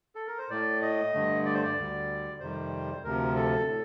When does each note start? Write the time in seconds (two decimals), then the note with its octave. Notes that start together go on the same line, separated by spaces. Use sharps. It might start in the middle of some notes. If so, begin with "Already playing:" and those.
0.15 A4
0.27 A#4
0.38 C5
0.50 A2 A3 D5
0.82 D#5
1.14 G2 D3 A3
1.45 D5
1.54 C5
1.63 D5
1.77 D2 D3 G3
2.40 F2 C3 D#3 G3 C5
3.04 D2 C3 F3 A#4
3.36 A4
3.67 A2